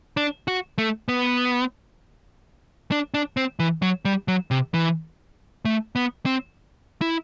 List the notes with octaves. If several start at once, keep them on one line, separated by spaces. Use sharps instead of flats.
D4
F#4
A3
B3
D4
D4
C4
E3
F#3
G3
F#3
C3
E3
A3
B3
C4
E4